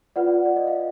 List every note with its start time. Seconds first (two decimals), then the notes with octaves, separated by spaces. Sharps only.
0.16 F4 B4 D5 F#5
0.45 D5
0.56 D#5
0.67 F5